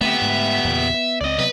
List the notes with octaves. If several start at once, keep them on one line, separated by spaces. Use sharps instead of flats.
A3 B3 C4 G4 E5
G#2 A3
E2 A#2 C#3
B3
C#2 C4 D5 D#5
C3 F#3 B3 B4